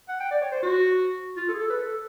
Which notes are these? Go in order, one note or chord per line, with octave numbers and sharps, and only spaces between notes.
F#5
G5
D5
C#5
C5
F#4
F4
A4
G#4
A4
B4
A4